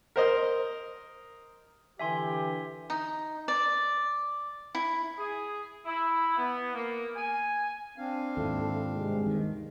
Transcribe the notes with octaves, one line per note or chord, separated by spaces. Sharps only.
A#4 C5 D#5
D3 E3 G4 E5 G#5 C6
D#4
D5
E4
G#4
E4
B3
A#3
G#5
C4 D4 F5
D#2 G#2 E4 F4 A4
G2 C3 G#3
D#3